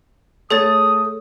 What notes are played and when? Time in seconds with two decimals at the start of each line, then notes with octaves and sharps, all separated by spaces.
0.50 A3 G#4 C#5 D#6 A6